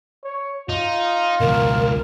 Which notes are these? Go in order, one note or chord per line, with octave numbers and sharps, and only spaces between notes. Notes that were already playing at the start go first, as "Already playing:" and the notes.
C#5
D#4 F4
C#2 B2 A#4